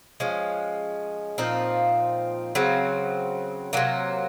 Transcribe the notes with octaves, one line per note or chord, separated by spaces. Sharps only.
F3 G#3 C#4
A#2 F3 C4 D#4
C#3 F#3 C4
C3 F#3 A#3